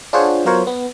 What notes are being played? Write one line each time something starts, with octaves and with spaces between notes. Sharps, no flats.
D4 F4 G#4 C5 C#5 F#5
F#3 B3 F4 A#4 C5 C#5
B3